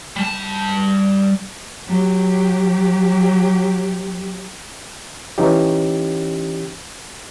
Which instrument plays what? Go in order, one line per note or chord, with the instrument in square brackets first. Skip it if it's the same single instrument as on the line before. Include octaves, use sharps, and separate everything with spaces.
[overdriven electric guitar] G3 A5
[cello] F#3 G4
[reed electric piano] E3 C#4 D#4 G4